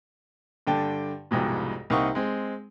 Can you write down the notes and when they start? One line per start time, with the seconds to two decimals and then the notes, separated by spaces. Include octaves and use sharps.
0.67 G2 D3 G5 A5
1.31 C2 F2 G#2 B2
1.90 C2 A#3 C4 D#4 F#5 C#6
2.15 G#3 C4